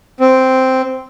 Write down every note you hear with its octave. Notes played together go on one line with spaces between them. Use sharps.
C4